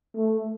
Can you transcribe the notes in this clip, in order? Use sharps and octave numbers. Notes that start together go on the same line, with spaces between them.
A3